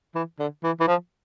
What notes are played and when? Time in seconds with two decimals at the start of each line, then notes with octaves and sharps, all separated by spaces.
0.15 E3
0.39 D3
0.64 E3
0.80 E3
0.87 F3